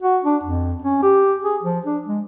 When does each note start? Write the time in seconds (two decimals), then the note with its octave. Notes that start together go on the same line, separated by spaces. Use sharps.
0.02 F#4
0.24 D4
0.44 F2
0.82 C#4
1.02 G4
1.43 G#4
1.63 F3
1.85 D4
2.07 G#3